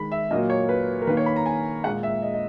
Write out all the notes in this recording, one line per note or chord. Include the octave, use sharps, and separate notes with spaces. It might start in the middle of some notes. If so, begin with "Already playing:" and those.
Already playing: D#3 G#3 B5
E5
A#2 F#3 A#3 D#5
C#5
B4
A#4
D#3 A#3 B4
C#5
B5
A#5
G#5
A#2 G#3 F#5
E5
D#5
D#5